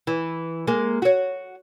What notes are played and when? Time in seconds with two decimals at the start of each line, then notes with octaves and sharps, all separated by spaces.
0.07 E3
0.67 G#3 A#3
1.02 F#4 C#5